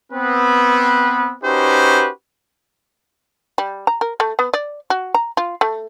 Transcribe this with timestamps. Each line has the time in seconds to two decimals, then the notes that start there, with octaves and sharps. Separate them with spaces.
0.12 B3 C4 B4
1.44 C#4 D#4 F#4 G4 B4 C5
3.58 G3
3.87 A#5
4.01 A#4
4.20 A3
4.39 B3
4.54 D5
4.90 F#4
5.14 A#5
5.37 F4
5.61 A3